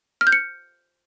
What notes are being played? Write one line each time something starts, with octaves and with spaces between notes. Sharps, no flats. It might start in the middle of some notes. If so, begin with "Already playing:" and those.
F6
G6
C#7